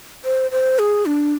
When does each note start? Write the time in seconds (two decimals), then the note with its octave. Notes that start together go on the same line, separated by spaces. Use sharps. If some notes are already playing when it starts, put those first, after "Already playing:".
0.25 C5
0.51 C5
0.79 G#4
1.06 D4